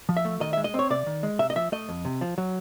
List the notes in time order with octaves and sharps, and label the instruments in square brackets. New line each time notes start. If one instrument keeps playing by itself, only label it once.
[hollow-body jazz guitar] F3
E5
A3
D#3 D#5
G#3 E5
D#5
C4 C#5
C3 D5
D#3
G#3
C3 E5
D#5
F3 E5
A3 D#5
F2
C3
F3
F#3